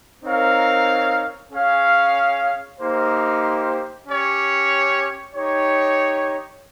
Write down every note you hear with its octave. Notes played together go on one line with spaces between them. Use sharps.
C4 D#4 A#4 C#5 F5
C#4 G#4 C#5 F5
A#3 D#4 G4 C5
C#4 G4 C#5
D#4 G4 C#5